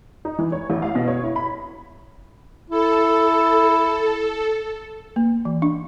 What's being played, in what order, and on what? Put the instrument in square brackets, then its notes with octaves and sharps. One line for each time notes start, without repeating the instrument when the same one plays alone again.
[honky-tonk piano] D#4
E3
C#5
A1
F5
B2
C#5
E4
B5
[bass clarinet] E4 [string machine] A4
[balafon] A#3
E3
D4